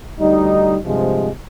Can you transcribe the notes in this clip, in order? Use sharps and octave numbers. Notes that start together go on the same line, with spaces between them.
D2 G3 D#4
G2 C3 F3 G#3